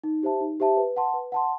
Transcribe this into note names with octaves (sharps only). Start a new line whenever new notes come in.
D#4
G4 C5 E5 A5
D#4
G4 C5 E5 A5
B4
F#5 A5 C6
B4
F#5 A5 C6